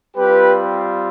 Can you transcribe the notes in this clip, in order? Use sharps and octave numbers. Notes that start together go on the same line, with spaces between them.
G3 C4 F4 G4 B4